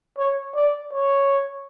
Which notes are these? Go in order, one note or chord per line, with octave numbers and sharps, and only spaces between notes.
C#5
D5
C#5